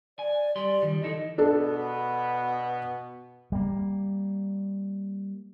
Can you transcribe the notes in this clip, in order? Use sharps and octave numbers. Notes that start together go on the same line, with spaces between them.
D5 G#5
G3 D5 C6
D#3 F3 G3
E3 D#4 A4 D#5
B2 B3 D4 A4
G3 A#3